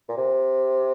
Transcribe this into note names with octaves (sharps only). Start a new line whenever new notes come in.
A#2
C3